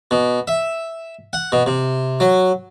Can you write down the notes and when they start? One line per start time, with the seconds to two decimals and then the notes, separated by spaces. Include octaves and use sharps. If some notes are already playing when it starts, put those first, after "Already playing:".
0.11 B2
0.48 E5
1.33 F#5
1.52 B2
1.66 C3
2.20 F#3